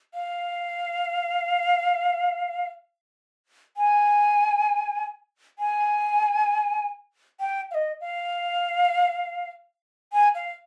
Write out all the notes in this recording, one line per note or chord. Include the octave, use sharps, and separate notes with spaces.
F5
G#5
G#5
G5
F5
D#5
F5
G#5
F5